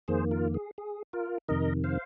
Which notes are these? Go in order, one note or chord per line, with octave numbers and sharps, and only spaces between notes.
F2 D#3 A#3 G#4 C5
F4 A#4
G#4
G#4
F4 A#4
F2 C3 D#3 A#4 D#5
C5 F5